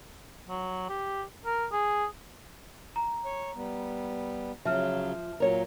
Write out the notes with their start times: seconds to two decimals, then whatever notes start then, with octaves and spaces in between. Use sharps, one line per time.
0.49 F#3
0.89 G4
1.45 A#4
1.72 G#4
2.96 A#5
3.25 C#5
3.56 G3 B3
4.65 C#3 F3 F#3 E5 F6
5.40 A#2 F#3 A#4 C#5